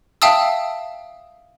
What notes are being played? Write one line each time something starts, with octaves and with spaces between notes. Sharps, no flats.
E5 F5 G5 A5 D#6 E6